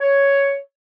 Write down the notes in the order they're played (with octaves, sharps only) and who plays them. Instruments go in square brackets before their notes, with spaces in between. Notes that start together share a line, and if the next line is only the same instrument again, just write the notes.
[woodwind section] C#5